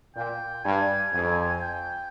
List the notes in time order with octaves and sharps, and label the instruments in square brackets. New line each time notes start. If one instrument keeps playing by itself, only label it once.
[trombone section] A#2 [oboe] G5
[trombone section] G2 [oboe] G#5
[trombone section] F2
[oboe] G5